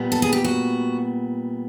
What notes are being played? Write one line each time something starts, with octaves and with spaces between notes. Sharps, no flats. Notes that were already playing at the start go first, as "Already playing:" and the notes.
Already playing: A#2 G3 B3
A4
G#4
G4
F#4